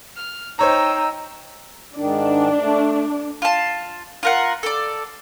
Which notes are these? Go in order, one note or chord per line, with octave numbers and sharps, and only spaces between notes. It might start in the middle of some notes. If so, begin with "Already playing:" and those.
F6
D#4 C5 C#5 G5 A#5 E6
G#2 D#3 D4
A3
F4 A5
F4 A#4 F#5
A4 D5